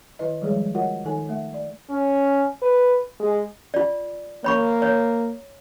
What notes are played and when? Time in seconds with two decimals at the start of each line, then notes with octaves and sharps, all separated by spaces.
0.19 D#3 E4 B4 D#5
0.41 D#3 F3 G3 G#3 G#4 C#5
0.74 F4 F#4 A#4 C#5 D#5 F#5
1.05 D#3 D#4 A4 G#5
1.29 A3 E5
1.54 D5
1.90 C#4
2.62 B4
3.20 G#3
3.74 F4 D5
4.44 A#3 C#5 B5 C#6
4.82 C#5